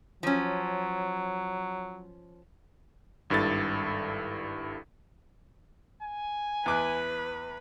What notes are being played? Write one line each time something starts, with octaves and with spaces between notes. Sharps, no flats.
F3 F#3 C#4
G#1 G2 E4 A4 A6
G#5
E2 B4 D6 F#6